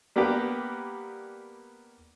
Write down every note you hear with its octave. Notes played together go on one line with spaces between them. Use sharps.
G3 A#3 B3 D4 G4